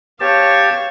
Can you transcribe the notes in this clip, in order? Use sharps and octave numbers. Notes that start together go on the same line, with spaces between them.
G4 C#5 F5 A5